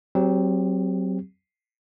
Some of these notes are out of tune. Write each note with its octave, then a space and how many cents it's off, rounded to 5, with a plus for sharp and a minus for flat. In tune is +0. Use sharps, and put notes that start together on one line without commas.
F#3 +30 C4 +0 G4 +30